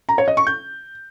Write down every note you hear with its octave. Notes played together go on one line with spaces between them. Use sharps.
A#5
C#5
D#5
C#6
G6